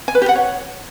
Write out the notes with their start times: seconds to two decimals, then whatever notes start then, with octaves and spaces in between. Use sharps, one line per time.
0.08 G#5
0.15 B4
0.22 G4
0.28 F#5
0.35 C#5